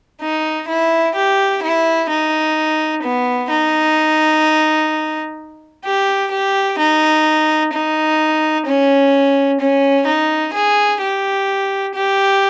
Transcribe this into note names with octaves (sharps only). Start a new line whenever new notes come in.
D#4
E4
G4
E4
D#4
B3
D#4
G4
G4
D#4
D#4
C#4
C#4
D#4
G#4
G4
G4